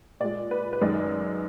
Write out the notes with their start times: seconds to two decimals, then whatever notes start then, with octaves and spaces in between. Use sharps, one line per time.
0.20 A#2 G#3 D5
0.51 B4
0.73 B4
0.81 F#2 D#3 G#3 D5